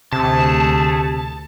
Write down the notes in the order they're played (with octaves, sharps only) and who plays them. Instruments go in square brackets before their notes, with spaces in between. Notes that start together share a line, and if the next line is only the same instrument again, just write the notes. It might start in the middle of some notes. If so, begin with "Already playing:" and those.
[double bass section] D2 [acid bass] C3 [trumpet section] A3 G#4 [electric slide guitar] A5